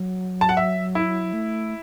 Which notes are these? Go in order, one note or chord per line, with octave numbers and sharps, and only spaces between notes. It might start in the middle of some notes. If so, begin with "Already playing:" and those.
Already playing: F#3
A5
F#5
E5
E4
A3